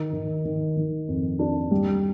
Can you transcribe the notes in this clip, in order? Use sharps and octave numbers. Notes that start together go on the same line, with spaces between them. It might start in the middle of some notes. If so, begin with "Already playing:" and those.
Already playing: D#3
D#3
D#3
D#3
F2
D4
G3